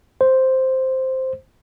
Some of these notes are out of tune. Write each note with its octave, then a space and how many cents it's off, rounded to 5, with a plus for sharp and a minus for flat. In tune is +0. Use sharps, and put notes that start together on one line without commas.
C5 +0